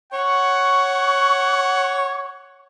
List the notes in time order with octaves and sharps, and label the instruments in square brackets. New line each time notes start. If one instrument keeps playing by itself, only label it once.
[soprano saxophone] C#5 [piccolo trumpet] F#5 [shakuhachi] C#6